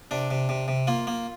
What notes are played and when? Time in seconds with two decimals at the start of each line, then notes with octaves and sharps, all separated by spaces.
0.11 C3 D4
0.30 C3
0.49 C3
0.68 C3
0.87 A#3 F4
1.07 A#3